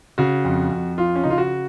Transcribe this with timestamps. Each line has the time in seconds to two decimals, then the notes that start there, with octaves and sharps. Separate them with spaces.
0.18 C#3 F#4
0.45 F2
0.72 F2
0.98 F3 F4
1.16 C#4
1.23 C#3 D#4
1.30 F4
1.38 F#4